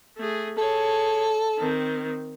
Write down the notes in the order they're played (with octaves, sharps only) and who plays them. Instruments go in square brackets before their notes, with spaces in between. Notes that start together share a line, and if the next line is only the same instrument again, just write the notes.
[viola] A3 G#4
[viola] G#4 C#5 [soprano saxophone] A4
[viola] D#3 C4